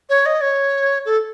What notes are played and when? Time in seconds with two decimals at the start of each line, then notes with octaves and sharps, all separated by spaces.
0.09 C#5
0.25 D#5
0.41 C#5
1.05 A4